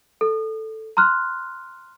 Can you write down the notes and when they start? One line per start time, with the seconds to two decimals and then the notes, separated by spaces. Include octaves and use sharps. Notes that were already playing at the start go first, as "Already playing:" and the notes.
0.21 A4
0.97 A#5 C6 F6 F#6